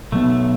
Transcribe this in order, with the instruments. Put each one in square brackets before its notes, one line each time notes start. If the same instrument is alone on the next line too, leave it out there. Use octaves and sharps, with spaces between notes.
[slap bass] B2 F#3 B3 [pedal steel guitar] A3